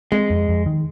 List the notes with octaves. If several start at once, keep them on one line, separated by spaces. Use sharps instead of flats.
G#3 C4
F2
F2
D#3